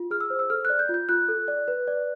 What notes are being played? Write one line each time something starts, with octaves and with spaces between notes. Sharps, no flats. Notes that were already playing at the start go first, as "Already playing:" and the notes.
Already playing: F4
G#4 F6
E6
C5
E6
A4 F6
D5 F#6
G6
F4
G6
F4 F#6
A4
D5
B4
D5